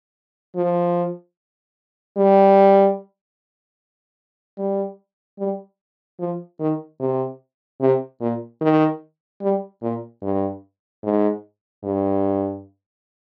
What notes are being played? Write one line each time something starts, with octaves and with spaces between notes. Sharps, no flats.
F3
G3
G3
G3
F3
D#3
C3
C3
A#2
D#3
G3
A#2
G2
G#2
G2